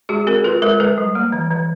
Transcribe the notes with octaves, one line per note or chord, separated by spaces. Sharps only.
G#3 F#4 G#4
C4 G#4 A#4
F4 A4 B4
G#3 A#4 C5
G#3 A4 B4
G3
A#3
E3
E3